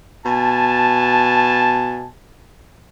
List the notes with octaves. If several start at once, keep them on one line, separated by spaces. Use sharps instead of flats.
B2 G#5 A5